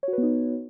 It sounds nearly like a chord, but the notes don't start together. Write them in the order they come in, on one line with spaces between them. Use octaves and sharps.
C#5 F#4 B4 B3 D#4